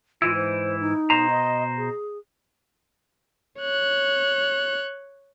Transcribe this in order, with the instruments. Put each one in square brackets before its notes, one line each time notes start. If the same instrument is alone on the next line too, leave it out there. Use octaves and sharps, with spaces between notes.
[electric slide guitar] G#2 E3 E4 [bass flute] F4
[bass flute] C5
D#4
[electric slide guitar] B2 C5 A#5
[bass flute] D#5
G#4
[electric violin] C#5 F#6